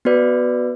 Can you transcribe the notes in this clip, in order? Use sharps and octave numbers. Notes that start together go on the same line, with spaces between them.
B3 F#4 B4 D5